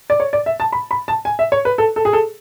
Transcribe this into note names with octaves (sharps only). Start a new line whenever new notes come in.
D5
C#5
D5
E5
A5
B5
B5
A5
G#5
E5
C#5
B4
A4
A4
G#4
A4